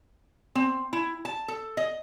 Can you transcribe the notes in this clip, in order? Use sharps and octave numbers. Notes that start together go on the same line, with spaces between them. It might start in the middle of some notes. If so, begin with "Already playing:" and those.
C4
E4
A5
A4
D#5